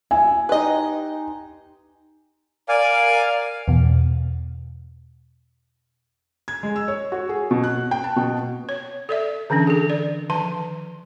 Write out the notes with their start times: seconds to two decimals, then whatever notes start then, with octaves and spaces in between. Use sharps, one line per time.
0.11 E4 G#5
0.49 D#4 G4 B4 D#5 C6
2.69 A#4 D5 F5 G#5
3.68 E2 B2
6.48 G#6
6.63 G#3
6.76 E6
6.88 C#5
7.12 F#4
7.29 G#4
7.51 B2
7.64 F#6
7.91 G5
8.04 A5
8.16 B2
8.69 C#5
9.09 A4 D5 E5
9.50 D3 E3 C#4 D4
9.67 G#4 A4
9.90 D5
10.30 D#3 F3 A5 C6